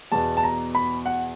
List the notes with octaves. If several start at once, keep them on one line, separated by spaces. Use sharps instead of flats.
E2 B2 A5
A5
A#5
B5
F#5